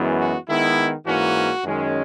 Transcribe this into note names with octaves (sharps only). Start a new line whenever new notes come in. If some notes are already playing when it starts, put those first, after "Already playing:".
Already playing: F#2 E3 G#3 B3
F#4
D#3 G#3 B3 E4
G#2 E3 A#3 C#4 F#4
F#2 D#3 G#3 C#4